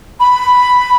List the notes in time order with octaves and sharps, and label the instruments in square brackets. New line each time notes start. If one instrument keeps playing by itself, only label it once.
[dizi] B5